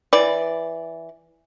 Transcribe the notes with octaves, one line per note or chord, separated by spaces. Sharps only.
E3 D5